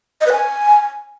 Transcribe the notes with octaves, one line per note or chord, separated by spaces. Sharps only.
D#5
B4
G#5